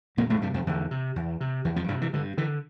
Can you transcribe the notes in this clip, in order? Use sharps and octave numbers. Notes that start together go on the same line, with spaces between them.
E2 A#2 A#3
A2 A3
G2 C3 G3
F2 F3
E2 D3
C3
E2
C3
E2 E3
F2 F3
G2 C3 G3
E3
G2 D3
D3 E3